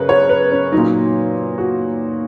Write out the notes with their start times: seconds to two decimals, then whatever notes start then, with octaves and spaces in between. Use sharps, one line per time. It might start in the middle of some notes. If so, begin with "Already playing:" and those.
Already playing: F#2 C#3 A#4 B4
0.09 C#5
0.29 B4
0.52 C#4
0.72 A#2 F#3 D#4
1.58 F#4